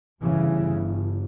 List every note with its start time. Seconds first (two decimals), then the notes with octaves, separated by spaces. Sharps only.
0.23 G1 G2 C#3 E3